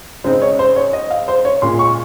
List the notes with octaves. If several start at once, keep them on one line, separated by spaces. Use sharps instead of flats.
C#3 G#3 C4 D#4 C5
C#5
C5
C#5
D#5
F5
C5
C#5
A#2 G#3 C#4 C6
C#6